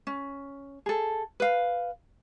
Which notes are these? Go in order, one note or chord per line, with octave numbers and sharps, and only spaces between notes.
C#4
G#4 A4
B4 F5